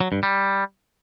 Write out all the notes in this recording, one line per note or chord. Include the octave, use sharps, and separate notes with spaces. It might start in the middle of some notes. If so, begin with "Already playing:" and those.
F#3
G2
G3